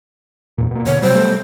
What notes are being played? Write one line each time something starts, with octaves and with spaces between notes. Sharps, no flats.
E2 A#2
B2 A#3
B2 D3 C#5
C3 F#3 G3 C5
G3 A3 B3